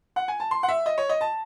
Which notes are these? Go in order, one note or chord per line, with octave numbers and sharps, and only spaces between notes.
F#5
G#5
A5
C6
F#5
E5
D#5
C#5
D#5
A5